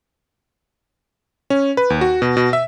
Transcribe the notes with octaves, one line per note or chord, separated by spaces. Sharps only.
C#4
B4
D#2
F#4
B2
B2
E5